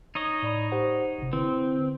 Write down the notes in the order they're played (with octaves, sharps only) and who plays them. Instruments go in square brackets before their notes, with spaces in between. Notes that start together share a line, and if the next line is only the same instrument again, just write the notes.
[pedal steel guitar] D#4 C#5 D#5
[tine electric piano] A2 D5 B5
G4 C5 F#5
G1 C3
[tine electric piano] D3 E4 B4 [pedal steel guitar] C4